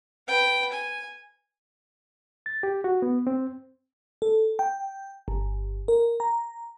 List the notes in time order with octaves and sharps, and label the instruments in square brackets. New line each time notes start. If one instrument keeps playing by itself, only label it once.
[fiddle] B4 G5
G#5
[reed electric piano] A6
G4
F#4
B3
C4
[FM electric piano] A4
G5
G1
A#4
A#5